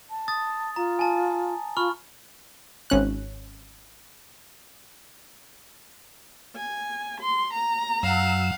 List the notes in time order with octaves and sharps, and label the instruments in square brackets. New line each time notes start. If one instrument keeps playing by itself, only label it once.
[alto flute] A5
[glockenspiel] D#6 A6
[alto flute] F4 [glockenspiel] A#5
[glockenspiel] G#5 A5
[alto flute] F4 [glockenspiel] B5 C#6 F6
[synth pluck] G#1 C#4 F#6
[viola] G#5
C6
A#5
[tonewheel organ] F#2 E6 [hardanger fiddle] F5 F#5